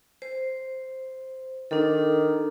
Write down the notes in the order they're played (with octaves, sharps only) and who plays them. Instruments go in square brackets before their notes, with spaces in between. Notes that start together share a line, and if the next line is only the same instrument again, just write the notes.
[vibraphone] C5
[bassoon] D#3 [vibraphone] D4 A4